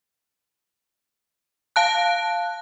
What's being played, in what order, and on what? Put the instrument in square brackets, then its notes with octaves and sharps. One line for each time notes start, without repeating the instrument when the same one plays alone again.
[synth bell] F5 A5 F#6